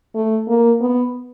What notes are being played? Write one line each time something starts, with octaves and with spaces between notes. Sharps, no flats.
A3
A#3
B3